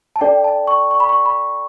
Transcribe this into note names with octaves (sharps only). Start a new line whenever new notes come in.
A5
D4 A4 D5 G5
A5
C#6
C#6
B5
C#6
B5